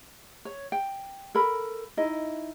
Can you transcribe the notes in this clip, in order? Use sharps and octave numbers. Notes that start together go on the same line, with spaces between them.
C#5
G5
A4 A#4 B5
D#4 E4 D#5